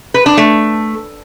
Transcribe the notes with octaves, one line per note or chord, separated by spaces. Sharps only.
B4
D4
A3